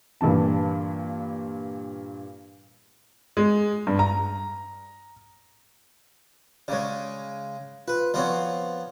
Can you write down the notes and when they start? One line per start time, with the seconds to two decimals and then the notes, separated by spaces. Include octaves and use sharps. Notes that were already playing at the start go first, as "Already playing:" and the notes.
0.21 G2 A#2 E3 A5
3.37 G#3
3.87 G2
3.99 A#5
6.68 C#3 G#3 C#5 D5
7.88 F4 B4
8.14 F3 B3 C4 C#5 D5